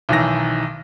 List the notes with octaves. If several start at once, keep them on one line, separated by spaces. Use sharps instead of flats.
B1 D#3 E3 A#6